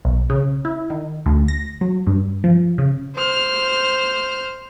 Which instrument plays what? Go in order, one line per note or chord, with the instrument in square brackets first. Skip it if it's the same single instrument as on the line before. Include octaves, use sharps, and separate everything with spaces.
[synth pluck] B1
C#3
E4
D#3
D2
A#6
F#3
G2
F3
C#3
[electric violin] C5 F6